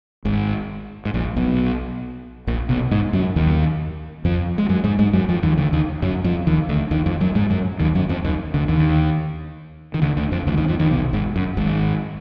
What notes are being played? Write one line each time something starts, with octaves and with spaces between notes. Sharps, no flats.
G#1 G#2
G#2
A#1 A#2
B1 B2
A#1 A#2
B1 B2
G#2 G#3
F#2 F#3
D#2 D#3
F2 F3
G#3
F#2 F#3
G#2 G#3
G#2 G#3
F#2 F#3
F2 F3
D#2 D#3
D2 D3
D#2 D#3
F#2 F#3
F2 F3
D#2 D#3
D2 D3
D#2 D#3
F2 F3
F#2 F#3
G#2 G#3
F#2 F#3
D#2 D#3
F#2 F#3
F2 F3
D#2 D#3
D2 D3
D#2 D#3
D#3
D2 D3
D2 D3
F2 F3
D2 D3
F3
D#2 D#3
F2 F3
D#2 D#3
B1 B2
G#1 G#2
F#2
G#1 G#2